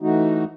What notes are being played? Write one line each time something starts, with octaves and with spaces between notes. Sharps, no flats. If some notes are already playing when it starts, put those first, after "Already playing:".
E3 A3 D#4 F#4